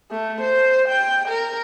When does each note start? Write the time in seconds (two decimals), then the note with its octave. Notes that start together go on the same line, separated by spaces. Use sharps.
0.11 A3
0.41 C5
0.89 G5
1.29 A#4